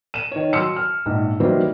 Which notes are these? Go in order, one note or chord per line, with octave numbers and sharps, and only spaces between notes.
D#7 E7
D#3 C#5
F#3 C6 E6 C#7
F6
A#1 G#2
D#3 E3 F#3 G3 A#3 C5